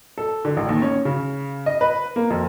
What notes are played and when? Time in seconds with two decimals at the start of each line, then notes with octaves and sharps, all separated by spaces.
0.18 A4
0.45 D3
0.57 A1
0.69 D#2
0.82 C#4
1.05 C#3
1.66 D#5
1.81 B4
2.16 A#3
2.30 F2